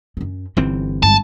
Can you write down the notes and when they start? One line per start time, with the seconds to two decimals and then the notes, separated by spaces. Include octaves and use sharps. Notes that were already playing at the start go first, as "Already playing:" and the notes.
0.17 F#2 C#4
0.57 G1 E3 C4 C#4
1.03 G2 G#3 A5